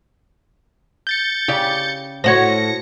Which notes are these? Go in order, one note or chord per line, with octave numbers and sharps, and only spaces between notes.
G6 A6 C#7
C#3 G4 D5
A2 F#4 C5 C#5 A#6 C#7